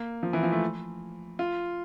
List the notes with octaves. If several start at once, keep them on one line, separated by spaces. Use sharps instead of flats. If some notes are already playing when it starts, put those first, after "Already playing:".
Already playing: A#3
F3
E3
F3
A3
F4